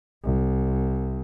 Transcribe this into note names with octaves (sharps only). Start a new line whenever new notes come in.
C2